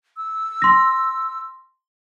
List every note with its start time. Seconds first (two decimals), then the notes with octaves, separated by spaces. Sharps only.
0.17 E6
0.62 C6 A#6